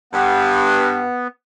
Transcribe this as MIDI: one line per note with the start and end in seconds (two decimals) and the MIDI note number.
0.13 1.04 43
0.13 1.28 59